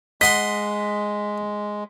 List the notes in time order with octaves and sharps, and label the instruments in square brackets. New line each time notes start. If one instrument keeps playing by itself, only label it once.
[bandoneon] G#3 [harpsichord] D#5 F#5 C6 [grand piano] B6